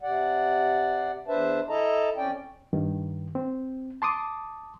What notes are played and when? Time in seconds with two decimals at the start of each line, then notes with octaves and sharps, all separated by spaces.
0.02 C3 D5 F#5
1.28 E2 D4 B4 C5 E5 A5
1.69 E4 A4 D#5 A5 A#5
2.17 F2 C#4 D5 G5
2.73 G2 D#3
3.35 C4
4.02 A5 C6 D6 D#6